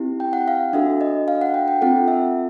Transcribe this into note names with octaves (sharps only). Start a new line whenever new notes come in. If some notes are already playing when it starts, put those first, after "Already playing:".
Already playing: C4 E4 G4
G5
F#5
F5
D4 F#4 A4 E5
D#5
F5
F#5
G5
G5
C4 F4 A4 F#5
E5